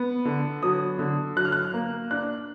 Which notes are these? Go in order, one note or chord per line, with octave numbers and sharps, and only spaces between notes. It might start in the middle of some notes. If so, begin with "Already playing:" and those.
Already playing: B3
D3
F#3 D#6
D3
F#3 F#6
F6
F#6
A#3
D4 F#6